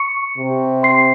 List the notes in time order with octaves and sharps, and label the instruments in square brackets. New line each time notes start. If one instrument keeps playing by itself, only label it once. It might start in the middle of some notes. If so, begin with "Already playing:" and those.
Already playing: [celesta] C#6 C#7
[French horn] C3
[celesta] C6 C7